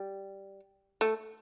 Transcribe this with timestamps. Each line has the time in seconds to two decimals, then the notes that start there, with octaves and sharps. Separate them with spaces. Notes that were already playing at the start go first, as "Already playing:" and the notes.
Already playing: G3
1.01 A3